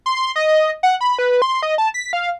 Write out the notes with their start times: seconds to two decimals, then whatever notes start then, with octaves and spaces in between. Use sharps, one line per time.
0.06 C6
0.36 D#5
0.83 F#5
1.01 B5
1.19 B4
1.42 C6
1.62 D#5
1.78 A5
1.94 B6
2.13 F5